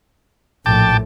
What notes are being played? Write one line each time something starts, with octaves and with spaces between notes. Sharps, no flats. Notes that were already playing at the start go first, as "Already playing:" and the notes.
A#1 A2 G5 A5 D6